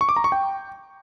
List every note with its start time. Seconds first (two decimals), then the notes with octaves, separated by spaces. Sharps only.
0.01 C#6
0.09 D6
0.16 A#5
0.24 C#6
0.32 G5